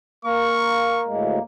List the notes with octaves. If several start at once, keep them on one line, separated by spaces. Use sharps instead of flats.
A#3 A#4 C#6
D2 A2 G#3